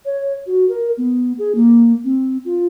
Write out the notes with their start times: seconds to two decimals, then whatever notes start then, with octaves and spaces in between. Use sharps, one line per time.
0.05 C#5
0.47 F#4
0.69 A#4
0.97 B3
1.38 G#4
1.55 A#3
2.04 C4
2.45 F4